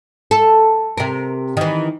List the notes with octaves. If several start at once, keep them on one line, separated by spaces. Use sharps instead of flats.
A4
C3 A#4
D#3 E3